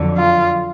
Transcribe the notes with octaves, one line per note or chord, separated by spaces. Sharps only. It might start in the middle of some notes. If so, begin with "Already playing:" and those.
Already playing: F2 D3 F#3
F4